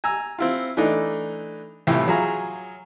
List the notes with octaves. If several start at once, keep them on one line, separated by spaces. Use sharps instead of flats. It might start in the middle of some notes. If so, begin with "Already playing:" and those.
G#5 A#5 E6
C4 E4 F4
E3 A3 D4 D#4
C2 A2 C3 E3 F3
F#3 F4 G#4 A#5